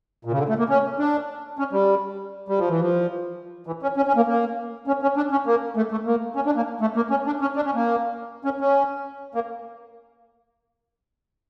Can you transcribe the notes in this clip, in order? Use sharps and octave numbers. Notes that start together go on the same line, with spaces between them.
A#2
C#3
D3
A3
A#3
C#4
D4
C#4
G3
G3
F3
E3
F3
E3
C#4
C#4
C#4
A#3
A#3
C#4
C#4
D4
C#4
A#3
A3
A3
A#3
C#4
D4
A#3
A3
A#3
C#4
D4
C#4
D4
C#4
A#3
C#4
C#4
A#3